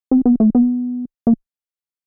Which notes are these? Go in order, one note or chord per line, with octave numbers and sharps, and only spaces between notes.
C4
B3
A3
B3
A#3